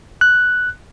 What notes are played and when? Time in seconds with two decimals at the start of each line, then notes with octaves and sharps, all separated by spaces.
0.21 F#6